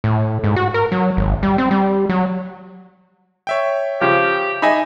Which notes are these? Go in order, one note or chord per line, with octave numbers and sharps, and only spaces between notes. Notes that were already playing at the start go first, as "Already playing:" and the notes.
A2
G#2
F#4
A#4
F#3
G#1
G3
C4
G3
F#3
C#5 E5 G5
C#3 F3 G4
D#4 E5 G#5 B5 A#6